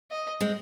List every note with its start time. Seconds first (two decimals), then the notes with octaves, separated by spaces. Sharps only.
0.11 D#5
0.41 G#3 C4